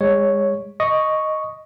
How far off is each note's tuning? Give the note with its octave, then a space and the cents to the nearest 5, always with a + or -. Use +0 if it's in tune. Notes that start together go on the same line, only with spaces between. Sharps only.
G#3 -35 C#5 +0
D#5 +0 C#6 +0